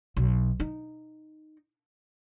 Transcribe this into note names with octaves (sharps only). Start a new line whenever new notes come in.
B1
D#4